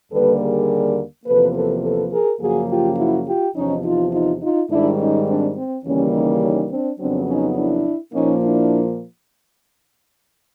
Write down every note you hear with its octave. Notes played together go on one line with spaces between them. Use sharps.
D#2 D3 G3 A#3 A4 B4
G#4 A#4
E2 C3 F3 A#3 A4 B4
A4 B4
A4 B4
G#4 A#4
F#2 C#3 F3 A#3 F#4 G#4
F4 G4
E4 F#4
F4 G4
E2 C3 F3 C#4 D#4
D#4 F4
D#4 F4
D#4 F4
G#2 D#3 G3 D4 E4
C#4 D#4
C4 D4
C4
D#2 C#3 E3 G3 A#3 C#4
C#4 D#4
C#4 D#4
C4 D4
F2 C#3 F#3 B3 C4 D4
C#4 D#4
D4 E4
A#2 F3 A#3 C#4 D#4
D4 E4